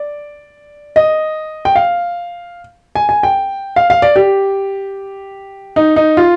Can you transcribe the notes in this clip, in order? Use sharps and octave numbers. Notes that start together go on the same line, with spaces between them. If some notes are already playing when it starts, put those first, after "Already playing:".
Already playing: D5
D#5
G5
F5
G#5
G#5
G5
F5
F5
D5
G4
D#4
D#4
F4